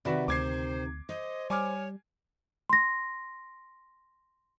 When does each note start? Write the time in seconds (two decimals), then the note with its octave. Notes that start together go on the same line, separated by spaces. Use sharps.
0.05 C3 D#3 F#4 B4 D5 E5
0.28 D2 C5 D6 G#6 C7
1.09 C5 D#5
1.50 G3 C#5 G#5 D6 F6
2.70 C6 A#6